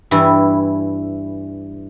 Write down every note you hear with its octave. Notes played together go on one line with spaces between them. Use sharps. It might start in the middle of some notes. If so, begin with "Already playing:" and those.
G2 E3 E4